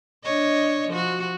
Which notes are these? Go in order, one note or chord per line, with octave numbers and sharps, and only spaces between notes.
D4 C#5 D#5
F3 F#4